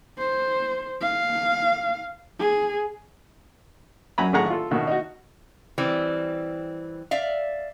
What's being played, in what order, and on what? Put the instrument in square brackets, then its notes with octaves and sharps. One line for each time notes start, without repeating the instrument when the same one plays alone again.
[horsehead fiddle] C5
F5
G#4
[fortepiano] F#2 F#3 G#5 A#5 B5
A1 D#3 A3 G#4 F#5 A#5
F4 A4
A1 B2 D#3
D#4 F#4
[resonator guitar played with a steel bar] E3 G3 C4
D5 E5 F5